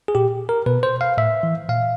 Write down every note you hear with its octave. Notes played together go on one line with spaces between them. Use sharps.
G#4
A#2 G4
A#4
B2 B4
C5
F5
A2 E5
E3
A#2 F5